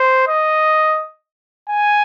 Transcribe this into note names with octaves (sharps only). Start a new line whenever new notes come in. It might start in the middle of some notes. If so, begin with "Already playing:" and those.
Already playing: C5
D#5
G#5